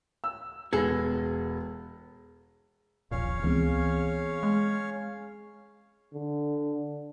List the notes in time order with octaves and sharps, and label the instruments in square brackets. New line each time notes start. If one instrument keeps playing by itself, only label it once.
[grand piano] E6
[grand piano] E1 B3 A#6 [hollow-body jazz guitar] G#4 A4
[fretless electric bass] D#1 A#1 [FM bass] A#2 [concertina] C#4 C#5 F5
[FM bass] C#2 [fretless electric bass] E3 B3 C4 [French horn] G#4
[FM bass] G#3
[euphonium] D3